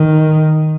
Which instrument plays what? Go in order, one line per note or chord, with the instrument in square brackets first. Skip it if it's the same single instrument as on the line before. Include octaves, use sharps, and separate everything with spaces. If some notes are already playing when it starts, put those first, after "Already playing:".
Already playing: [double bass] D#3